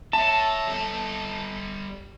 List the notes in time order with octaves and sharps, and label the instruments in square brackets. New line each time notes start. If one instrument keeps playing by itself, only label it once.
[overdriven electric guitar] C#5 E5 [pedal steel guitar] A5
[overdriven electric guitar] G3 A4